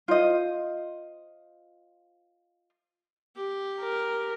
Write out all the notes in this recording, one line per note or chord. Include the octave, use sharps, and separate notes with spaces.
F4 C5 D#5
G4
A#4